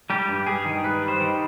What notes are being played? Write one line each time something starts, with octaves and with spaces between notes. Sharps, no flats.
G3 G4
G2
G2 G#4
D#3
G2 B4
G3
C5
D#3